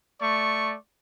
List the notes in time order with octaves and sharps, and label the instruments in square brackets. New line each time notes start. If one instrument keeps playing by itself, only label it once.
[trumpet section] A3 D5 C#6